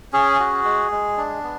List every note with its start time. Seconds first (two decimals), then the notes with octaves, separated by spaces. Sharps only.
0.13 C#4 G#4
0.39 F#4
0.65 G#3
0.91 G#3
1.17 D4
1.44 B3